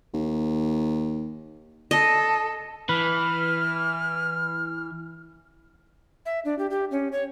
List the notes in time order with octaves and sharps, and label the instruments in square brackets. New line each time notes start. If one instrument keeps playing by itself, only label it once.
[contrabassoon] D#2
[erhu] A4 [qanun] D#5
[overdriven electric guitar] E3 [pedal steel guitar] B4 [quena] F6
[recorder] E5
D4
G4
G4
C#4
C#5